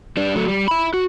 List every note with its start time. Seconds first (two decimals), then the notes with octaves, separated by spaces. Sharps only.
0.17 G3 D4
0.36 F#3 A3
0.48 G3
0.68 E5 B5
0.94 F#4